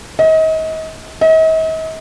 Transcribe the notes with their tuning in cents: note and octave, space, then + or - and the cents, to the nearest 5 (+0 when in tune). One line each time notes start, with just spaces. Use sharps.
D#5 +35
D#5 +45